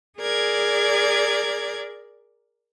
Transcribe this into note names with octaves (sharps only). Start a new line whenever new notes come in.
G#4 A#4 D5 G#6